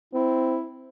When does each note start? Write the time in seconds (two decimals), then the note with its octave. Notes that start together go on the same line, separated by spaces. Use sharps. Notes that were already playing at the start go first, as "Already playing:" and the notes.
0.14 C4 E4